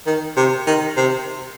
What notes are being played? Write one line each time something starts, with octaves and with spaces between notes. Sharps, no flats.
D#3
C3
D#3
C3